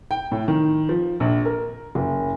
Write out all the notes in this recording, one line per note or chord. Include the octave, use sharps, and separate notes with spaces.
G5
A2
D#3
F3
A#1
A#4
F#1